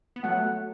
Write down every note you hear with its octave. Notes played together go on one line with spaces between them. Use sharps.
B3
F#3 A3 F#5